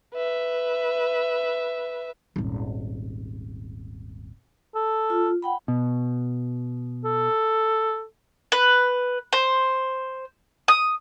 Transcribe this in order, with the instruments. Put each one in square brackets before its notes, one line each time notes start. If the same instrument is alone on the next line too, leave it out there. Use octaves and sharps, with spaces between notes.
[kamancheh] B4 E5
[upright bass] D#1 G#1
[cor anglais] A4
[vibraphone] F4
F#5 G5 B5
[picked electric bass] B2
[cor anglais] A4
[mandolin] B4
C5
D#6